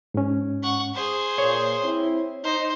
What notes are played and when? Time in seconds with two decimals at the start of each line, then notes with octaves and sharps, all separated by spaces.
0.14 G#2 C#4
0.63 F#5 C#6
0.94 G#4 C5
1.38 A#2 C#5
1.84 C4 E4
2.44 D#4 C5